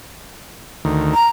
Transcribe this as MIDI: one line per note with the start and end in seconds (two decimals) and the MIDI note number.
0.85 1.15 38
0.85 1.15 51
1.14 1.28 82